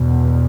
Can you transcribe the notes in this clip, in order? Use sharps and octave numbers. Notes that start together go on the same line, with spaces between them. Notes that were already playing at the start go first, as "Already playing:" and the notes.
Already playing: E2 B2